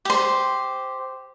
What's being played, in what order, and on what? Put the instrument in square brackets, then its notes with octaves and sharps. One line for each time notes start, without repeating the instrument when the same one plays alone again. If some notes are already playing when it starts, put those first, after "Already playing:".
[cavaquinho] G4 C5